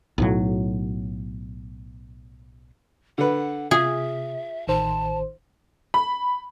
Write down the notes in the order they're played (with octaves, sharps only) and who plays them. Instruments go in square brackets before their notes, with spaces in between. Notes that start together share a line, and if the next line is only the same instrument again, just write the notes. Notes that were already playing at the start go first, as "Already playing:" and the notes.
[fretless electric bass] B1 A2 F#3
[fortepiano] D3 B4 [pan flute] F#5
[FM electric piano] C3 [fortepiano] F4 [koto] G#4 [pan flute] E5
[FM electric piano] A1 D#3 C5 [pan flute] A5
[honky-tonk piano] B5